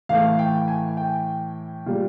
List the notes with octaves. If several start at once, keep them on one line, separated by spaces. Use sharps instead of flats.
A2 E3 A3 F5
G5
G#5
G5
A#2 G3